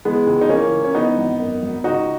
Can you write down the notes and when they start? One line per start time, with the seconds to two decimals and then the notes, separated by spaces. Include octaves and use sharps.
0.05 E3 G#3 B3
0.27 C#2
0.41 D#4
0.49 E3 A#3 C#4
0.72 C#2
0.84 C#4
0.94 E3 B3 D#4
1.18 G#1
1.39 F#2
1.63 G#1
1.84 C#2 D#4 F#4